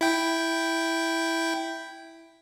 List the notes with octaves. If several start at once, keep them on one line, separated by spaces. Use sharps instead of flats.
E4 G5